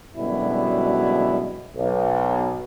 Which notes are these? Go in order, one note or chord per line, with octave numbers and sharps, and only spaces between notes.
F#2 B2 D3 G3 G#3 E4
B1